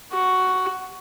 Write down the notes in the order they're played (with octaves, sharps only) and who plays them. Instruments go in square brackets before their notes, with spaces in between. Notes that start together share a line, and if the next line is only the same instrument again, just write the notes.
[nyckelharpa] F#4